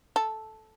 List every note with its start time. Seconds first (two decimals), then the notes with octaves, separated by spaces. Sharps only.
0.16 A4